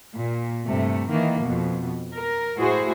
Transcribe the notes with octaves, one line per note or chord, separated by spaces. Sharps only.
A#2
G2 C3 A3
D#3 E3 A#3
F2 B2
A#4
A2 E4 F#4 G#4 C5